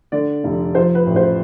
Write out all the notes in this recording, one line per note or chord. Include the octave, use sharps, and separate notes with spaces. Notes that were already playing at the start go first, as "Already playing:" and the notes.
D3 D5
F1
F3 C5
B4
A1
C5